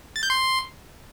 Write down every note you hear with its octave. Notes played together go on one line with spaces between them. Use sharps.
A6
G6
C6